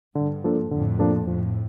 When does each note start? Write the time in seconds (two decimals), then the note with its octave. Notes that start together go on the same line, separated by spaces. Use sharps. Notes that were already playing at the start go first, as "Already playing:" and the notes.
0.15 G2 D3
0.44 F3 A#3 D4 A4
0.71 F2 A2 D3
0.99 F3 A#3 D4 A4
1.27 F2 A2 F3